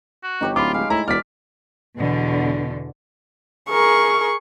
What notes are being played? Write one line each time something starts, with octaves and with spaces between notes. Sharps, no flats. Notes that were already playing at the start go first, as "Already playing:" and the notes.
F#4
G1 D#4 G4 C#5
D1 F4 B5 D6
G#3 F5
A2 E4 A#5
E1 D5 F6 B6
E2 B2 D3
G#4 A#4 C#6